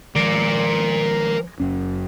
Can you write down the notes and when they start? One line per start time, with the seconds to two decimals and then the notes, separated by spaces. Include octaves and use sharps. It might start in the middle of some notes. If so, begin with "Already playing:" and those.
0.16 D#3 F3 G#3 A#4 D5
1.60 F#1 F#2 C#4